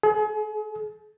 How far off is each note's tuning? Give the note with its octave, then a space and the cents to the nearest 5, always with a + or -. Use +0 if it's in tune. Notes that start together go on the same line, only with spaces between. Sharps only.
G#4 +40